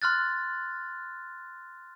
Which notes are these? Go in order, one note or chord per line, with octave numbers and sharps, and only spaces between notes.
C6 F6 F#6 A6